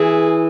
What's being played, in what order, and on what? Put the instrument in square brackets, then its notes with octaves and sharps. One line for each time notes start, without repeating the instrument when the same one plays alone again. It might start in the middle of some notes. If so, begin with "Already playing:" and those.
Already playing: [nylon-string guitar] E3 [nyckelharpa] G#4